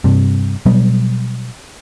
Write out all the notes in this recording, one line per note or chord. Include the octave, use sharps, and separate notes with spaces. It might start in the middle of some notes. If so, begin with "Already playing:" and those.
G2 C3
B2 F#3 G3 B3